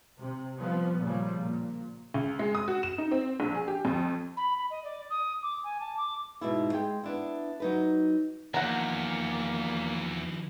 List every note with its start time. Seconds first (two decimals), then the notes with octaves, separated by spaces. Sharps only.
0.18 C3
0.59 F3 G3 B3
1.01 A#2 C#3 F3 G3
1.41 A#2
2.14 C#2
2.39 G#3
2.55 D#6
2.68 F#4
2.83 E7
2.98 D#4
3.11 C4
3.40 A#1
3.54 G#4
3.68 G4
3.85 F2
4.37 B5
4.58 B5
4.70 D#5
4.84 D5
5.10 D#6
5.42 D6
5.63 G#5
5.80 A5
5.96 D6
6.41 G#2 B2 E4
6.73 G#3 G5
7.03 B3 D4 E4
7.60 F#3 D#4 B4
8.54 E2 D#3 F3 A#3 F#5 A#5